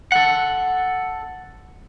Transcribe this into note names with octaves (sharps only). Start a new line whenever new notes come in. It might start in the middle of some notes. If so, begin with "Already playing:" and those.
A4 F#5